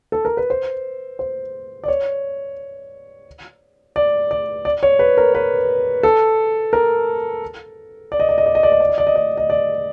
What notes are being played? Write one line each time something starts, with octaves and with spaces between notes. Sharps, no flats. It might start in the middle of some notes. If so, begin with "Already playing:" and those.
A4
A#4
B4
C5
C5
D5
C#5
D5
D5
D5
C#5
B4
A#4
B4
A4
A#4
D5
D#5
D5
D#5
D5
D#5
D5
D#5
D5
D#5
D5
D#5
D5
D#5
D5